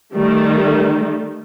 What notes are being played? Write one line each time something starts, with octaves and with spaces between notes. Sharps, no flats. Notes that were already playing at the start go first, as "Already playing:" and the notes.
D#3 G3 A3